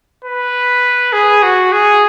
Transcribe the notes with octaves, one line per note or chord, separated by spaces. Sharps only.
B4
G#4
F#4
G#4